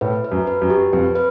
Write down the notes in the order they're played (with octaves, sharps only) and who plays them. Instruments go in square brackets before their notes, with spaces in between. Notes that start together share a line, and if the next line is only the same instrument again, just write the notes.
[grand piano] A2 [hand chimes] B4
[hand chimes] B4
[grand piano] F#2
[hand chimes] B4
[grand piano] F#2
[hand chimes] G4
[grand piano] F2 [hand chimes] B4
[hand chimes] B4